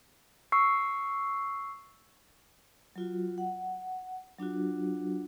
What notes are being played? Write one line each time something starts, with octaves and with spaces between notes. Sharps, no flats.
C#6 E6 C7
F#3 F4 F#4
F#5
F#3 D4 F4 F#4